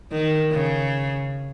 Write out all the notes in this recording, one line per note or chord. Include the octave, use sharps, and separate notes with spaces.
D#3
C#3